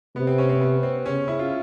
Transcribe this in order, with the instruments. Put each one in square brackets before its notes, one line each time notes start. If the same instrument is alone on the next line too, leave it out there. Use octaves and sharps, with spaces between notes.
[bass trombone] C3 [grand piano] B3
[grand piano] C4
C#4
C4
B3
C4
[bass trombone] C#3 [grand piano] C#4
[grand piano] E4
F4